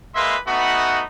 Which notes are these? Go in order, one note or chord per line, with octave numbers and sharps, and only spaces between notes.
G#3 A#3 B4 E5 C6
A3 B3 D#4 F#4 F#5 B5